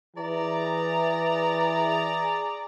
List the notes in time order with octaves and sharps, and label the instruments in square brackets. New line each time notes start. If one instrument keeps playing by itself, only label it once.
[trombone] E3 [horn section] G#4 D5 A#5